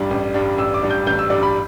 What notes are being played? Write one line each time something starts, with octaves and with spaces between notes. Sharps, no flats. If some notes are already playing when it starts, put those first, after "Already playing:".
Already playing: A1 G2 G3 D4
A1
G2 G3 D4
A1 E6
D6
G2 G3 D4
G6
A1 G6
E6
G2 G3 D4 D5
B5